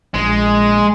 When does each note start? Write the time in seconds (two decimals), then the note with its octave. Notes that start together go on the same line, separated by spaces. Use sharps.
0.14 A#1 G#3